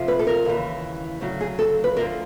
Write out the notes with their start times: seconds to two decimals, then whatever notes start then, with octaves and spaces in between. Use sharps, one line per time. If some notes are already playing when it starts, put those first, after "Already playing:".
Already playing: F2 C3 F3
0.08 B4
0.19 A4
0.27 A#4
0.45 D#2 C#3 E3
1.21 D2 C#3 F#3
1.41 G#4
1.59 A4
1.84 B4
1.97 D2 D3 F3 A#4